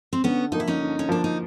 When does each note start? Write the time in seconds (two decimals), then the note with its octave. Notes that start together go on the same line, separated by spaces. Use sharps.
0.13 C4
0.24 D3 B3 C#4
0.52 F3 A#3 D#4
0.60 E4
0.68 C#4 D#4
0.80 D3
0.99 C#4
1.09 F3 A#3 D4
1.24 D#4